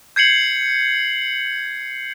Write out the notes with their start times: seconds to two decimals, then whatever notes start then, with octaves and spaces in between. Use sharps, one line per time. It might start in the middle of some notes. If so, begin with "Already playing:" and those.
0.16 G6 G#6 C7 C#7 F#7